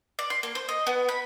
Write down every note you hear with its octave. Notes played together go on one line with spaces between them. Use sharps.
D5
C6
A#3
C5
D#5
B3
B5